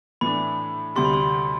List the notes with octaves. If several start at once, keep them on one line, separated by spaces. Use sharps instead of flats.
A2 E3 A3 D4 B5
D2 C3 G3 C6
B5
C6